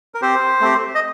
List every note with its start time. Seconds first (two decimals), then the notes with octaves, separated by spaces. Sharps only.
0.15 A#4
0.22 C4 G4 C5
0.61 A3 C4 G4
0.95 D#5